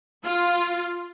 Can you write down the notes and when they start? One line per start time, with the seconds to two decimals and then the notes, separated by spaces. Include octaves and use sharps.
0.23 F4